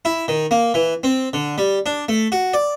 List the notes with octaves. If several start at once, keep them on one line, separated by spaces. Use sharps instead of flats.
E4
D#3
A#3
E3
C4
D3
G3
D4
A3
F#4
D5